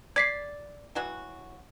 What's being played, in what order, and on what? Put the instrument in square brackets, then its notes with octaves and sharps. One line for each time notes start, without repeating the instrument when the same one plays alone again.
[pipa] D5 [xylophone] G#6 B6 C7
[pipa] E3 F#3 F#4